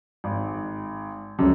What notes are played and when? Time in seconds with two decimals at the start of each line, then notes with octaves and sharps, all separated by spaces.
0.24 G#1
1.39 C#2 F#2 C#3